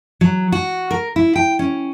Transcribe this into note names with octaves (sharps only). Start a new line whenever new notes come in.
F#3
F#4
A#4
E4
G5
C#4